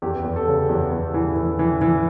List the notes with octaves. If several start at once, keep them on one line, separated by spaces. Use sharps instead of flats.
E2 G4
E2
A4
C#3
E2 G4
E2
E3
E3
E3
E3